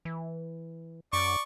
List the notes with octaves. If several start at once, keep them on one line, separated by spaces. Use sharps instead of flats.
E3
F#2 D5 C#6